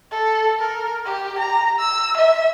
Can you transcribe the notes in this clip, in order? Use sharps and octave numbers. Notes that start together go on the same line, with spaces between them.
A4
A#4
G4
A#5
E6
E5